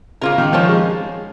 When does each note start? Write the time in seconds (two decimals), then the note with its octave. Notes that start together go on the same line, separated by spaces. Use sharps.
0.21 C#3 A#3 F4 A#4
0.38 D#3
0.53 F3 A#3 C#4 F4
0.68 G#3